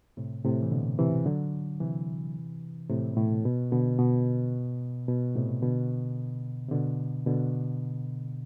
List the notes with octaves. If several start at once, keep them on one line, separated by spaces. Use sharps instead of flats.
A2 C3
A2 C3
E3
B2 D3
C3 E3
D3 F#3
C3 E3
A2 C3
B2
A2
B2
B2 D3
B2
B2
A2 C3
B2 D3
C3
B2 D3
B2 D3